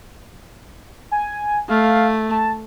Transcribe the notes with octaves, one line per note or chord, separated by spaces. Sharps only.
G#5
A3 F5
A5